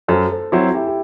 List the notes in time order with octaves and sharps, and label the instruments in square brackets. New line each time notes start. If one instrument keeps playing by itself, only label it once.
[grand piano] F#2 [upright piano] A4 C5
[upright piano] A4 C5
[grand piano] F#3 C4 E4
[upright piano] E4 G4
G4